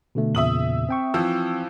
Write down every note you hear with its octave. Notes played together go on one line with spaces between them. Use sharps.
B2 D3 A3
E2 A#2 C#3 E5 D#6 F#7
C4 G5 C#6
E3 F3 E6